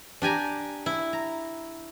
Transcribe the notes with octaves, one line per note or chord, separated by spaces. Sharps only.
D4 G4 G#5 A#5
E4
A#5